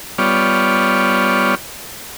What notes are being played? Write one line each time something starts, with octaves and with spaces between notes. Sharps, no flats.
G3 B3 F4 C#5 D5